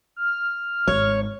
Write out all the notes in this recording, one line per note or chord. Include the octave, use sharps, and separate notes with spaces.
F6
G#1 C#5